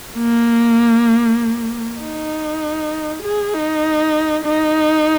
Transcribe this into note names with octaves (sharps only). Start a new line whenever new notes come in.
A#3
D#4
G#4
D#4
D#4